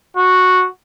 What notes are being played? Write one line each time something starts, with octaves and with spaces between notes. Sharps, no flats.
F#4